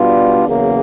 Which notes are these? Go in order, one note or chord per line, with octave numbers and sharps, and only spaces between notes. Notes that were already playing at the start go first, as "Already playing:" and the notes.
Already playing: B2 G3 B3 D4 F4
E2 C#3 F#3 A#3